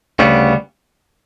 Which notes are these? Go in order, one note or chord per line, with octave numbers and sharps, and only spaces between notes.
D2 C#3 G3 B3